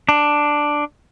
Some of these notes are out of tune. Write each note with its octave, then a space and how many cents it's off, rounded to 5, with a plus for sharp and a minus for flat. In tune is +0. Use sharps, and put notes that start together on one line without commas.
D4 +5